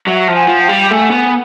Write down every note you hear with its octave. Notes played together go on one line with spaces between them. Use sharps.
F#3 E5 F#5
F3
F#5 G#5
F3
F5 G5
G3
A3 F#5 G#5
B3